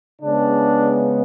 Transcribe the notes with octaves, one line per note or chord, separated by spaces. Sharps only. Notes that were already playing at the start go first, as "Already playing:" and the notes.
C#3 G#3 B3 D4